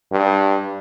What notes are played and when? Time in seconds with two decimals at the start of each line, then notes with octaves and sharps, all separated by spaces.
0.12 G2